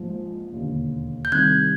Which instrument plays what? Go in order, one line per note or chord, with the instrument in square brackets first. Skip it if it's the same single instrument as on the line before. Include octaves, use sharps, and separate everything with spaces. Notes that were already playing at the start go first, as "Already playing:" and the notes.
Already playing: [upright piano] A#1 G#2 F3
E1 D#2 D3
[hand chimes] G6
[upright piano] C2 C3 D#3 [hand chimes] F#6 G#6